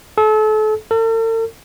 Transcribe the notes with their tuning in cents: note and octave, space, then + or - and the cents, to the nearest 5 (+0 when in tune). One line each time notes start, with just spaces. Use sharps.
A4 -35
A4 +45